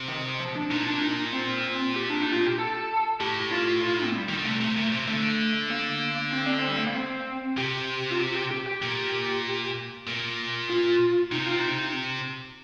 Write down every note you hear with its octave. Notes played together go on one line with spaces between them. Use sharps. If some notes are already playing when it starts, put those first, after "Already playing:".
Already playing: C3
D#3
F3
D4
A#2 D#4
D4
D#4
C4
G4
D4
D#4
F4
G4
A4
A2 G4
F4
F4
A3
G3
D#3
D3
C3 A3
C3
A#2
C3
D3 A3
A#3
C4
D4
C4
G3
A3
A#3
C4
C3 G4
F4
G4
G4
G4
G4
A#2
A#2
F4
C3 D#4
F4
D#4